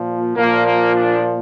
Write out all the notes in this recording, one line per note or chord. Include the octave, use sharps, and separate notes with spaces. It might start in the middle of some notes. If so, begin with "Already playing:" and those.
Already playing: A#2 F3
A#2 F3 A#3
A#3
D4